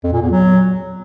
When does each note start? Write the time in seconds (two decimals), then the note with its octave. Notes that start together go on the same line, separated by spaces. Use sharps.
0.04 F2
0.13 A#2
0.22 E2
0.31 F#3